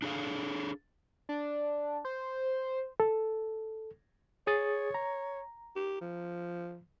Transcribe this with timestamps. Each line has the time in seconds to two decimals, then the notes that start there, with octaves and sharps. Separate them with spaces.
0.02 D4 G#4 A4 F5
1.29 D4
2.05 C5
3.00 A4
4.47 G#4 C#5 D#6 A6
4.94 A#5
5.76 G4
6.01 F3